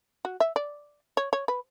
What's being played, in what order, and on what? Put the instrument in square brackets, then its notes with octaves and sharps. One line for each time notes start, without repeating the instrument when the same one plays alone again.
[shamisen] F#4
E5
D5
C#5
C#5
B4